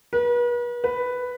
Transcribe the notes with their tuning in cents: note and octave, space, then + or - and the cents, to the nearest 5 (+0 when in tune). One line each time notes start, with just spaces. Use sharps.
B4 -40
B4 +5